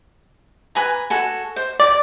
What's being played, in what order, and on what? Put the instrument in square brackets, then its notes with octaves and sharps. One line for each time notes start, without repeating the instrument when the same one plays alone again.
[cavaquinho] B4 G#5 A#5
F#4 A4 G#5
C5
[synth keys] D5 [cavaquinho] D6